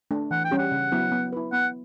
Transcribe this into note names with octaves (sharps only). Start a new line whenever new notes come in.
A3 D4
E3 F#5
G5
G3 C#4 G4
F#5
C#3
F#3 B3 E4
B3
E4 B4
B3 F#5